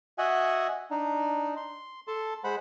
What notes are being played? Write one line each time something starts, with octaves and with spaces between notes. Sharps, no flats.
F#4 D#5 E5 F#5 G#5
D4 D#4
C6
A4 A5 C6
G#3 C5 F#5 B5